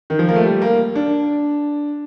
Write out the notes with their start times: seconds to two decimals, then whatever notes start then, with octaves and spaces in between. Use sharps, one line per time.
0.10 D#3
0.19 F3
0.29 A#3
0.36 A3
0.44 G3
0.62 A#3
0.95 D4